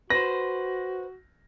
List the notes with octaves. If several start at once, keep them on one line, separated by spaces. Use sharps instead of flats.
F#4 B4 C5 A#6